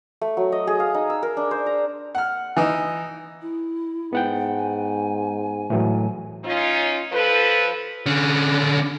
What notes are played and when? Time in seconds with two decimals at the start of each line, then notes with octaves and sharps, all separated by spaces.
0.21 A3
0.37 F#3
0.52 D#5
0.67 G#4
0.80 F5
0.94 D#4
1.10 E6
1.23 A#4
1.37 D4
1.51 C5
1.66 A#5
2.15 F#5 F6
2.57 E3 D#4
3.42 E4
4.13 G#2 B3 F#5 G5
4.58 G#5
5.70 A2 E3 F#3
6.44 C#4 D#4 F4
7.13 F3 A4 B4
8.06 D3 C#4